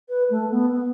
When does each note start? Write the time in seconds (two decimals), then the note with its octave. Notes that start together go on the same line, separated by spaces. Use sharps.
0.09 B4
0.30 A3
0.51 B3
0.72 B3